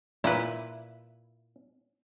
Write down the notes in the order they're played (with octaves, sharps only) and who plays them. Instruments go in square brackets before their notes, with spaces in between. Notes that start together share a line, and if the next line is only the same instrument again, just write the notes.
[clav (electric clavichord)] A#2 B4 [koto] E4